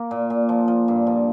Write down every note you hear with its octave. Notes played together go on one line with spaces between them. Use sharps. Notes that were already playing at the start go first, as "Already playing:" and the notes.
Already playing: A#3
A#2
A#2
F3
F3
G2
F3